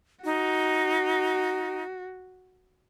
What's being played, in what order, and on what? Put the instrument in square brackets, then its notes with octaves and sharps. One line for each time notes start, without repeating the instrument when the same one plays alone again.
[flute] D#4 [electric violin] F#4